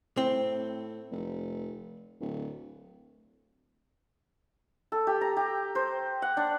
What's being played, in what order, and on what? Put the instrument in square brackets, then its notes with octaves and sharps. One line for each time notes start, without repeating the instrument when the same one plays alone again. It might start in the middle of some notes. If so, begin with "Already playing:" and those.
[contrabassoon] A2 [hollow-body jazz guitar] C4
[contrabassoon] F1
D1
[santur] A4
G4
A#5
G4
C5
F#5
D4